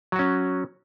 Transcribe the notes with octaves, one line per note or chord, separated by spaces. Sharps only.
F#3 C#4 F#4